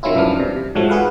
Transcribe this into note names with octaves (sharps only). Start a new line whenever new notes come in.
D#3 F#3 C#4 E4 F4
C2 F#2 E3 F3 D4 F6
C3
C3
G#2 F3 F#3 A3
F#4 G#4 B4 F5 F#5